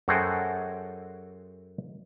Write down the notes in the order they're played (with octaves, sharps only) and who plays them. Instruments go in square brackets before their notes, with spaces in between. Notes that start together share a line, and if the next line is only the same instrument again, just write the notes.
[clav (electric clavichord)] F#2 F#4 G#4 A4 C5 G5